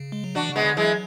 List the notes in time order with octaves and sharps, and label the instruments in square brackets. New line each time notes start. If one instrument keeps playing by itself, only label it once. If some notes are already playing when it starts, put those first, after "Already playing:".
Already playing: [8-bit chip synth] C#3
G#3
F#3
[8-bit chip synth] E3 [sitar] D4 F#4
[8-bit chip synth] C#3
[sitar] G#3 B3
[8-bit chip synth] D3
[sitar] E3 G#3 [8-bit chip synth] F#3